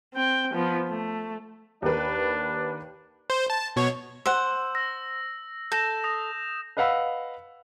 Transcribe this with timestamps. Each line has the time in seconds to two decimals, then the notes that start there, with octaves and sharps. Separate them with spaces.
0.14 C4 G5
0.54 F3 B3
0.89 A3
1.82 D#2 D4 A#4 B4
3.30 C5
3.50 A5
3.76 B2 C#5
4.26 C5 F#5 E6
4.75 E6 A#6
5.72 A4 G6 A#6 E7
6.04 D#6 A#6
6.77 B4 D#5 F5 F#5 B5 E6